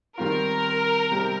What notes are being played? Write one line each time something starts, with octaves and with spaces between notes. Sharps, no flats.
D#3 G3 C4 F4 A#4
C3 G3 C4